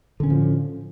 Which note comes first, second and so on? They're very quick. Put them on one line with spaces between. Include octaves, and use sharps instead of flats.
D3 C#4 A2 F3